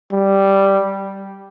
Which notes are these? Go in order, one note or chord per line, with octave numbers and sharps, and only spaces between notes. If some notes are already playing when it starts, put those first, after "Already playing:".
G3